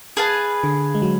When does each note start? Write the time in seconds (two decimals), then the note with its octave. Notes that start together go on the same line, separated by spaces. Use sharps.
0.17 G#4 B4 F5 A5
0.64 D3
0.95 G#3
1.02 F#3